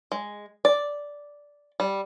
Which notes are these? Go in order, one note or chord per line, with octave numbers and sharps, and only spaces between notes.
G#3
D5
G3